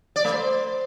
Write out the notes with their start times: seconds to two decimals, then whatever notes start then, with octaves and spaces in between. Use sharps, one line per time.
0.16 D5
0.25 A3
0.33 C5